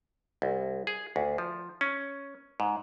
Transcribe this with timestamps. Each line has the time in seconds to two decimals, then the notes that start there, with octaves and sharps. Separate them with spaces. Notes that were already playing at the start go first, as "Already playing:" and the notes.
0.42 C2
0.87 G#4
1.16 D2
1.38 F3
1.81 C#4
2.60 G#2